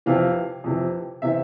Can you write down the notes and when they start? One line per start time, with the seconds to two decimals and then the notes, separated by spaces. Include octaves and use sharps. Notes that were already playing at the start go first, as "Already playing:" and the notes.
0.06 F2 C3 E3 F5
0.64 F2 C3 E3
1.22 C3 E3 E5